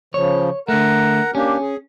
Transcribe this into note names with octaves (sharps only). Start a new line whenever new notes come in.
C#3 F3 C#5
D3 A3 A#4 F#5 A#5
A#3 C#4 D4 G4
G#4